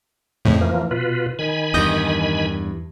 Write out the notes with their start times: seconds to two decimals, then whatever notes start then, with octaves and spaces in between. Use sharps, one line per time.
0.45 F2 A2 C#3
0.61 E3 F3 A#3
0.91 B2 F4 B4
1.39 D#3 G#5 B5
1.74 E2 G2 D#6 G6 A#6